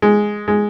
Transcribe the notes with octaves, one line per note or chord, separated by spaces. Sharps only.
G#3
G#3